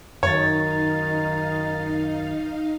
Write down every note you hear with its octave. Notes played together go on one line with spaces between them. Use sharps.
F#2 D#3 D#4 C#5 F5 A6